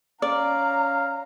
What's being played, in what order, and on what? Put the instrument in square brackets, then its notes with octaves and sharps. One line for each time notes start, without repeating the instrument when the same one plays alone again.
[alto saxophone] C#4 [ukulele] D5 [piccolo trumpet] F5 [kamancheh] A#5